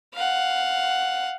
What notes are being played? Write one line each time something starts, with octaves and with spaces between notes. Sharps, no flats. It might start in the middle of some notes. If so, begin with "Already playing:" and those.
F5 F#5